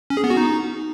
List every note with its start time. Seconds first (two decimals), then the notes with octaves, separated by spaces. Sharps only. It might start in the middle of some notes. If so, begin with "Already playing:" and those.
0.10 C#4
0.17 G#4
0.24 B3
0.30 F#4
0.37 D#4